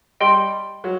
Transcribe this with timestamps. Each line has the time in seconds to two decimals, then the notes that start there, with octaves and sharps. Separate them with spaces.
0.20 G3 D#5 G5 C6
0.84 F#3